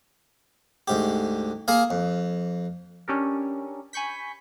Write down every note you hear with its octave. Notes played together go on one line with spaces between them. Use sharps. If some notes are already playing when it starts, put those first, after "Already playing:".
D2 G#2 G4
A#3 G#4 A#4 F5
F2
C#4 D4 G4 A4 A#4
G#5 B5 C#6 G6 B6